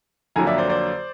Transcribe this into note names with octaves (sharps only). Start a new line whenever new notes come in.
F2 D3 F#3 A#3 G#5 A#5
D5 E5
C5 D5
C5 D5